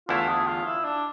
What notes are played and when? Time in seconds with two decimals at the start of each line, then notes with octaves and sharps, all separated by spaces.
0.09 E2 D3 A3 E4 F4
0.28 G#4
0.46 F4
0.66 E4
0.84 D4